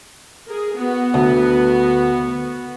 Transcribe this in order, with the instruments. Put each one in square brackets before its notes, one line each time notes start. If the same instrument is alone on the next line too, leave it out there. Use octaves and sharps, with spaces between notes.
[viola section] G#4 A#4
B3 F#4
[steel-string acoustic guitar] D2